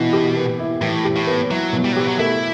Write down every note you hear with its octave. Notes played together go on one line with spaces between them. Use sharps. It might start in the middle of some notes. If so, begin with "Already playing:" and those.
Already playing: B2 E3 B3 E4
G4
B3
E4
A2 E3
G4
A2
B3
F#3 E4
B2
G3
F#3
E3 G4
F#3
A3 E4